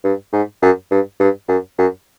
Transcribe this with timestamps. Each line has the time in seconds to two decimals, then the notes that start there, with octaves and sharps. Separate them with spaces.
0.04 G2
0.33 G#2
0.62 F#2
0.91 G2
1.20 G2
1.49 F#2
1.78 F#2